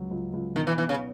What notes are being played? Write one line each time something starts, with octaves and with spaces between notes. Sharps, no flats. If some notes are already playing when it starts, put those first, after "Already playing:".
Already playing: C#2 F#3
C#2
C#2
B2 D#3
E3
E3 B3
C#3